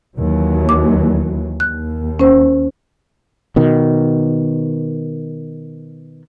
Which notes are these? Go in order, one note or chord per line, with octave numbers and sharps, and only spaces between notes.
D#2 E3 F#3
D6
D#2 F#6
C#4 C5
B2 D#3